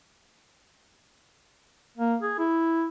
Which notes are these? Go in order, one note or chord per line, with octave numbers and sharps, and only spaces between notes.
A#3
G#4
E4